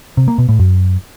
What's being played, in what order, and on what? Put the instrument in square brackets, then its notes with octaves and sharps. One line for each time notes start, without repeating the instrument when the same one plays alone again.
[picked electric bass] C3
A#3
B2
A2
F#2